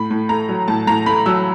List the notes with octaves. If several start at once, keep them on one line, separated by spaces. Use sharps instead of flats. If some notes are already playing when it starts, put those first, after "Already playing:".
Already playing: A2 B5
A2
A3 A#5
F#3
A2 A5
A2 A#5
A3 B5
F#3 E6